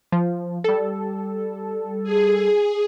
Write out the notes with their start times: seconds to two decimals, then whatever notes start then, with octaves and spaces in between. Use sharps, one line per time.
0.12 F3
0.64 G3 A4
2.03 G#4